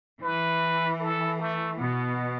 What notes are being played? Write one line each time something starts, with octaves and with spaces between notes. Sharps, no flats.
E3 B4
A4
A3
B2 B3